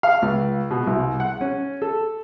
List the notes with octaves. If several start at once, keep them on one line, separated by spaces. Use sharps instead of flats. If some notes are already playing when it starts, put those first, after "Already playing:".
F5
C#2
B2
C2
F#5
C#4
A4